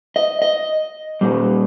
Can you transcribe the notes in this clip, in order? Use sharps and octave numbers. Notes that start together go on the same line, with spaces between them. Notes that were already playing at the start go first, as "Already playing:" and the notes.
D#5
D#5
A#2 G3